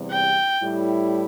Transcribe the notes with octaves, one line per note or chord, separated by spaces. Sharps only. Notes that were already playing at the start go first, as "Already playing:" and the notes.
Already playing: E2 C3 G3
G5
A2 G3 E4